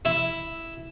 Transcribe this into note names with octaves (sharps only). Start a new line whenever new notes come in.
E4